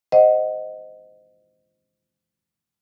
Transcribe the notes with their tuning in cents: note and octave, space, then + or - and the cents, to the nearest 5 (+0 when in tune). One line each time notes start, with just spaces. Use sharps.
C5 -15 D#5 +0 F#5 +0